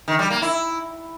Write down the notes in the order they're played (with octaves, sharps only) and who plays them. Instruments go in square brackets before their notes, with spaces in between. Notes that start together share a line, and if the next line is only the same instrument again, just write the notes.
[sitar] D#3
G3
A#3
E4